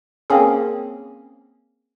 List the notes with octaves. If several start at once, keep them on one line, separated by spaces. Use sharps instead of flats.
A#3 C4 C#4 G#4